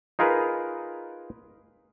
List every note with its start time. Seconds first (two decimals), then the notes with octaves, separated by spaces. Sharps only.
0.19 D#4 F4 G#4 A#4 B4